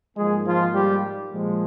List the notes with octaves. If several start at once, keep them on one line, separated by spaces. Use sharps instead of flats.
G#2 F3 G#3 A#3 G#4
F3 F4
G3 G4
A#2 F3 G#3